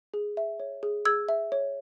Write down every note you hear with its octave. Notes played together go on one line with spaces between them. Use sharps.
G#4
E5
C#5
G#4
G#4 E6 G#6
E5
C#5